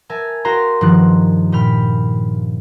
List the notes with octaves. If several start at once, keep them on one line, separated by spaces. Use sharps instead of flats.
A#4 E5 G#5 A5
F#4 A#4 F5 G5 A#5 C6
G2 D#3 F3 F#6
A#2 G5 B5 F6